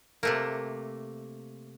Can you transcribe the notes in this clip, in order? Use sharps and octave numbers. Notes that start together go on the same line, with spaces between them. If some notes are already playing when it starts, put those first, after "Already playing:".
C3 A3 A#3